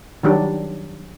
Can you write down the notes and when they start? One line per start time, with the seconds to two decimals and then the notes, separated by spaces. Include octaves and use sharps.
0.23 D#3 F#3 G3 D4